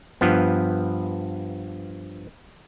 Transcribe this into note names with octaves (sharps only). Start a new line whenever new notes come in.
G2 F3 B3